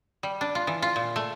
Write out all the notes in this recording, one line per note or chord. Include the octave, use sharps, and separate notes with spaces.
G3
D4
F4
E3
F4
A#2
A3